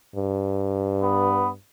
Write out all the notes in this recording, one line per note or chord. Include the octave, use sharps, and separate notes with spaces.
G2
B3